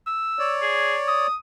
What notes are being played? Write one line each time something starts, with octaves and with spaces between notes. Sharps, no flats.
E6
C#5 D5
G#4
D#6